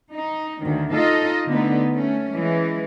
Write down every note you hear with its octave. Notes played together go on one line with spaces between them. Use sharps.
D#4
D2 D#3
D#4 F4 A4 D#5
D3 A3 B3 D#4
A3 C#4
E3 G#3